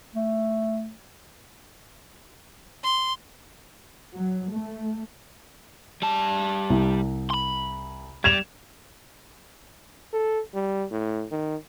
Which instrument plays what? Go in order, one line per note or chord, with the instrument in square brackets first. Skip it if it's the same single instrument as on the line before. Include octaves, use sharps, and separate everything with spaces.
[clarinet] A3
[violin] C6
[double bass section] F#3
A3
[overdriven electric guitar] G3 A5
[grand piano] C2
[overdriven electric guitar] B5 C6
[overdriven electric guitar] G3 [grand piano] G#6 E7 F7
[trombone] A4
G3
A2
D#3